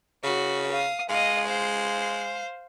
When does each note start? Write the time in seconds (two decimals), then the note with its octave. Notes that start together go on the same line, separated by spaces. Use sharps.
0.24 C#3 F#4
0.71 F5 D#6
1.09 G#3 D#5 F5
1.47 C5 F5